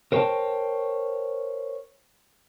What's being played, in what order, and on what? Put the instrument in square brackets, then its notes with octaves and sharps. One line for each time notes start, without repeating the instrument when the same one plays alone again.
[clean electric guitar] A#4 C5 C#5 E5 G5 A5